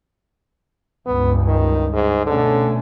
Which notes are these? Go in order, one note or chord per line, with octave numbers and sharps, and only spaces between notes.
C#2 G2 B3
D#3
G#2
B2 D3 A3 C#4